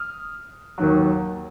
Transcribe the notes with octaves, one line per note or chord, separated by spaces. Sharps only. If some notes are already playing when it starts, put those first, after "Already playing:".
Already playing: D#6 F6
D#2 D#3 F#3